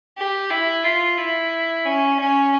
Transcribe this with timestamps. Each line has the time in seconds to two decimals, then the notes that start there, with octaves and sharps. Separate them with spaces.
0.18 G4
0.51 E4
0.84 F4
1.18 E4
1.85 C#4
2.20 C#4